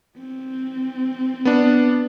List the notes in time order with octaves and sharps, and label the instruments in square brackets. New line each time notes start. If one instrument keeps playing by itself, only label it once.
[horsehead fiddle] C4
[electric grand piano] B3 D4